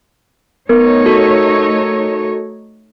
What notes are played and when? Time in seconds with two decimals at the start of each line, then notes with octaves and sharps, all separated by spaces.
0.69 A3 B3 D#4 A#4 C#5
1.06 F#4 A4